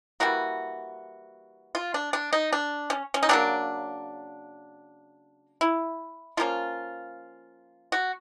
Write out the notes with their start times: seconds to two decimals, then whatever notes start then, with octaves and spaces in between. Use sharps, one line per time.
0.20 E3 G3 A#3 F#4
1.75 F4
1.94 D4
2.13 D4
2.33 D#4
2.53 D4
2.90 C#4
3.14 C#4
3.23 D#4
3.29 C#3 F#3 A#3 D4
5.61 E4
6.37 F3 A#3 C#4 F4
7.92 F#4